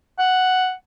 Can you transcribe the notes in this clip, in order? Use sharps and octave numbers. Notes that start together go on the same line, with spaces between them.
F#5